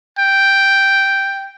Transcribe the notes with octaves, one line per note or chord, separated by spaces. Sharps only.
G5